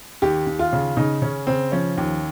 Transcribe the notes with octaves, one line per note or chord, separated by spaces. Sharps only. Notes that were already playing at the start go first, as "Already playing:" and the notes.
D#2 G4
D#2
F4
C#3
C#3 D#4
C#3 C#4
C#3 C4
F3 C#4
D#2